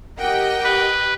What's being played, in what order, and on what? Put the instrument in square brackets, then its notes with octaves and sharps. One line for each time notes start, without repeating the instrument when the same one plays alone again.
[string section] G4 D#5 G5 [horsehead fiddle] A#4 F#5
[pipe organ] B4